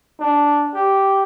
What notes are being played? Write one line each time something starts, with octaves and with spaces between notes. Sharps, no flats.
D4
G4